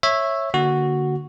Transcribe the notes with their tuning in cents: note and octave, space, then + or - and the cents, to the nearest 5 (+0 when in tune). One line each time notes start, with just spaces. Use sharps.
C#5 -15 E5 +0
D3 +0 A#3 +0 F#4 +0